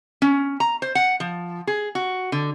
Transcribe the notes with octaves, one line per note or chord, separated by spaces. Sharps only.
C#4
A#5
C5
F#5
F3
G#4
F#4
D3